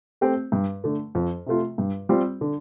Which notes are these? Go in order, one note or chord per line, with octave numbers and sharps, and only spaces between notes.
A3 C4 G4
G2
D3 A3
F2
C3 A3 F4
G2
G3 C4 F4
D3